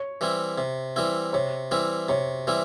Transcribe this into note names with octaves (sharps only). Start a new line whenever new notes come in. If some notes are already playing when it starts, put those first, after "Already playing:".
Already playing: C#5
E3 G3 C4 E4
C3
E3 G3 C4 E4
C3 C#5
E3 G3 C4 E4
C3 C#5
E3 G3 C4 E4